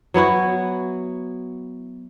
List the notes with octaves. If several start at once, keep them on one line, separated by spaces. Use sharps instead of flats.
F#3 B3 E4 F#4